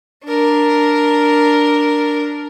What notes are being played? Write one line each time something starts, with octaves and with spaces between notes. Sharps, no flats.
D4 A#4